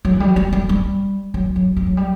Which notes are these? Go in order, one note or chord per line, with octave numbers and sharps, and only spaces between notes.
F#3
E3
G3
F#3
G3
G3
G3
F#3
F#3
G3
F#3
G3